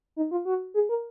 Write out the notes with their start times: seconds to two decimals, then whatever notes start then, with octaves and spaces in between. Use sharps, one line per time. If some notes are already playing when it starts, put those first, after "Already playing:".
0.16 D#4
0.31 F4
0.45 F#4
0.74 G#4
0.89 A#4